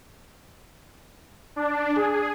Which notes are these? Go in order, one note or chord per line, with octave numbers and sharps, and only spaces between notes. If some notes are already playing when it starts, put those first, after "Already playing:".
D4
G#4